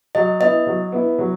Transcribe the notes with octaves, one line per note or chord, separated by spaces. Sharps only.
F#3 D#5
B3 E4 D#5
F#3
B3 E4
F#3